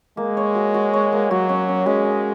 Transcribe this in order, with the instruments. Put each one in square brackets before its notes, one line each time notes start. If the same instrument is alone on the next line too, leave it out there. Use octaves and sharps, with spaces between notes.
[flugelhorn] G#3 [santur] A#3
[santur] C#5
F#4
F#4
C#5
A#3
[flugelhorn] F#3 [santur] F#4
[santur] C#4
C#4
[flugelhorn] G#3 [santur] C#4
[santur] D#5